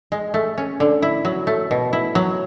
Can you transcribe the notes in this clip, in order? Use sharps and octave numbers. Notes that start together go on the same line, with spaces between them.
G#3
A3
C#4
D3
E4
F#3
A3
B2
E4
F#3